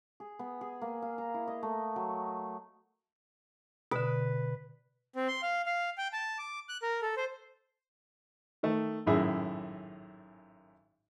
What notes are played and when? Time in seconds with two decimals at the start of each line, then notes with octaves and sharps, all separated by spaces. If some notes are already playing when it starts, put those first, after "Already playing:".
0.20 G#4
0.39 B3
0.61 G#4
0.82 A#3
1.02 F5
1.18 A#5
1.34 E4
1.48 D#5
1.63 A3
1.96 F#3
3.91 B2 D3 B4
5.16 C4
5.28 C6
5.43 F5
5.66 F5
5.98 G5
6.13 A5
6.38 D6
6.69 F#6
6.83 A#4
7.02 A4
7.17 C5
8.63 D#3 A3
9.06 G#1 F#2 A2 G#4 E5